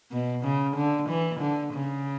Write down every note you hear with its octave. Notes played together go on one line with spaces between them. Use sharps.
B2
C#3
D3
E3
D3
C#3